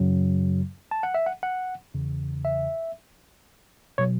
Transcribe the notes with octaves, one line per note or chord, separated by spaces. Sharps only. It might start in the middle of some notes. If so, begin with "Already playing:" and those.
Already playing: F#2 C#3 F#3
A5
F#5
E5
F#5
F#5
E2 C#3 E3
E5
B2 F#3 C#5